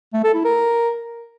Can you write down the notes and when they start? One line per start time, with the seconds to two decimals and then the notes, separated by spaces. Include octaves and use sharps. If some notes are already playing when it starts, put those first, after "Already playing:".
0.13 A3
0.24 A4
0.34 E4
0.44 A#4